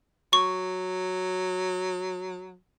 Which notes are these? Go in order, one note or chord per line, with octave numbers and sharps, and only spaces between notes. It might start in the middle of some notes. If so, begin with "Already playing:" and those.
F#3 C#6